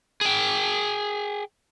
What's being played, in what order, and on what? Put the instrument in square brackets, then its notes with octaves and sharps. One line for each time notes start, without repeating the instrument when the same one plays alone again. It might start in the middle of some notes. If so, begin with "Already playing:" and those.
[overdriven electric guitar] G#4 G5